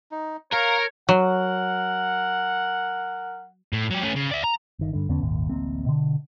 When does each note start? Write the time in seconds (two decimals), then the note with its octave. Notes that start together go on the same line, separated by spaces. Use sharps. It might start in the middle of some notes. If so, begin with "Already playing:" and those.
0.11 D#4
0.52 A#4 C#5 F5 A#5
1.09 F#3 A#4 F#5
3.73 A2
3.90 F#3 G4
4.02 A3 C#4
4.15 C#3
4.31 D5 E5
4.44 A#5
4.79 G1 D#3
4.93 G2 D3
5.09 E2 D3 B3 C#4
5.22 G#1 D#2 A#2
5.49 D1 A1 A#3 C4
5.86 B2 D3